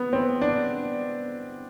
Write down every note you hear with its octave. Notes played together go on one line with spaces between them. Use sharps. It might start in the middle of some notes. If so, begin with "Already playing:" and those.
Already playing: B3
C4
D4